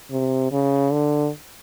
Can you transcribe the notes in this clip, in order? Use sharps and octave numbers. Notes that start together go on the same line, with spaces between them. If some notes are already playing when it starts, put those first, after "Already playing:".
C3
C#3
D3